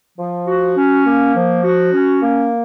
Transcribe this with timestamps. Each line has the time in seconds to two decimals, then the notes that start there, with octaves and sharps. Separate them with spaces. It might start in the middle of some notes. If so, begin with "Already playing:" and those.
0.18 F3
0.47 F#4
0.76 C#4
1.06 A#3
1.35 F3
1.64 F#4
1.93 C#4
2.22 A#3